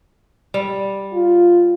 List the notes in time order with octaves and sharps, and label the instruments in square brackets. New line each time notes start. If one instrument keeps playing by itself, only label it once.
[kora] G3
[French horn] F4